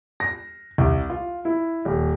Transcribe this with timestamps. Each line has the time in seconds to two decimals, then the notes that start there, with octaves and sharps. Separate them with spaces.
0.20 A#6
0.78 C2
1.10 F4
1.45 E4
1.85 D#1